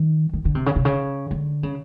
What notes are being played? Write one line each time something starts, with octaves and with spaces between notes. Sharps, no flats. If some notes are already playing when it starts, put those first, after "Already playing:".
Already playing: D#3
D#3
D3
C3
C#3
C3
C#3
D3
C#3